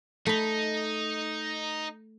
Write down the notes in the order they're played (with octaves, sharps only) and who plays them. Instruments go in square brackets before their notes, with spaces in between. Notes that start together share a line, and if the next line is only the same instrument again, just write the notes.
[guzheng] A3 B5 [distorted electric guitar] D#4